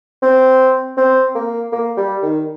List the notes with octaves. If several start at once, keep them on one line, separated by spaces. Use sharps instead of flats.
C4
C4
A#3
A#3
G3
D#3